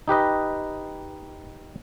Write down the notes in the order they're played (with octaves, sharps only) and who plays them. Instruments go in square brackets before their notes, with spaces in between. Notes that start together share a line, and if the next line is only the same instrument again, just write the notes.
[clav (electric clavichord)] D#4 G4 B4 D#5